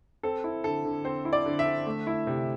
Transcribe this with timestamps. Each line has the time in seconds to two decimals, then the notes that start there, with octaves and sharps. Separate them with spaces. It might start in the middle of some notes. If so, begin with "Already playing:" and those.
0.23 C4 A4
0.44 E4
0.64 D3 A4
0.85 D3
1.05 C4 C5
1.25 E4
1.33 D5
1.46 D3
1.59 E5
1.66 D3
1.86 A3
2.07 E4
2.27 C3